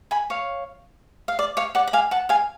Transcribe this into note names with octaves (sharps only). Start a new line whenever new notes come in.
G#5 B5
C#5 F5
F5
D5
C#5 F5
D5 F#5
F#5
F5 G#5
F#5 A5
F5 G#5